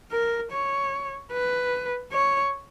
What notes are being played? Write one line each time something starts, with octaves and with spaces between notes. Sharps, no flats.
A#4
C#5
B4
C#5